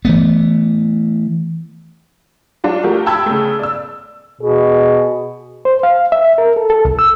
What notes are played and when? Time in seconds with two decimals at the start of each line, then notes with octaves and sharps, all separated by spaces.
0.05 E3 A3 B3
2.64 F#3 D4 F4 F#4
2.84 F3 A3 F#4 G4 A#4
3.06 G5 A5 B5 E6 G#6
3.26 C#3 A3
3.59 D5 E6
4.41 B2 G#4
5.65 C5
5.83 F5
6.12 E5
6.38 A#4
6.56 A4
6.70 A4
6.85 C2
6.99 E6